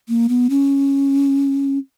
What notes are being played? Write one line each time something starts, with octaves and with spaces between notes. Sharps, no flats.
A#3
B3
C#4